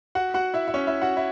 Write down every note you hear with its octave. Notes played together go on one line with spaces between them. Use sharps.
F#4 F#5
F#4 F#5
E4 E5
E5
C#4 C#5
E4 E5
F#4 F#5
E4